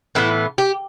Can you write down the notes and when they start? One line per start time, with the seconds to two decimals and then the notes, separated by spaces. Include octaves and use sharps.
0.15 A2 E3 B3 E4
0.58 G4